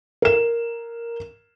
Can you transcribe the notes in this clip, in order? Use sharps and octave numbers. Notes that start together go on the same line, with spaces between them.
A#4 E7